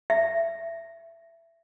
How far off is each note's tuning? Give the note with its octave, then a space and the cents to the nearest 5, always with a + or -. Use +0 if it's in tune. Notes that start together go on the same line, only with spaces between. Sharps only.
E5 +15